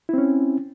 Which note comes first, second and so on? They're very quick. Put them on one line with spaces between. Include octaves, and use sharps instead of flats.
E4 C4 C#4